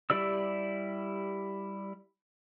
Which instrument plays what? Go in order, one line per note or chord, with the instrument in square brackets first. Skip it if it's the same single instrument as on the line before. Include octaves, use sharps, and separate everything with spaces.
[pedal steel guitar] G3 E4 G4 D5 E6